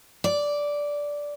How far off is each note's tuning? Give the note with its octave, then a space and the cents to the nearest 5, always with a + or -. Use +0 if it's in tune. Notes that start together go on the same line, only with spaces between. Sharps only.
D5 -10